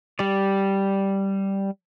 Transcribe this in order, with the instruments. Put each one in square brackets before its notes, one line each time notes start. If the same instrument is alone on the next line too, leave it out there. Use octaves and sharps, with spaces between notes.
[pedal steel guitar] G3 D5